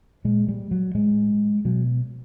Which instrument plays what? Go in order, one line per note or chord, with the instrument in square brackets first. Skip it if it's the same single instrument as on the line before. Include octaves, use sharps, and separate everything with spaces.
[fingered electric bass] A#2 G#3
G3
F#3
A2 G#3
B2 F#3